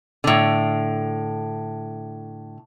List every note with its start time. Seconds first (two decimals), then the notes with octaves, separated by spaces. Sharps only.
0.24 A2 D3